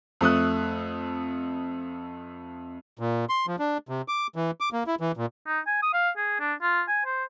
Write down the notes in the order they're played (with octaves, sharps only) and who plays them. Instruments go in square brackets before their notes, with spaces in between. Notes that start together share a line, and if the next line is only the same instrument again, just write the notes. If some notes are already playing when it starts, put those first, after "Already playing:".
[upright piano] F2 A3 D#6 F#6
[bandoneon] A#2
C6
F3
D4
C3
D6
E3
D6
A#3
E4
E3
A#2
[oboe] D#4
G#5
D#6
F5
G#4
D4
F4
G#5
C5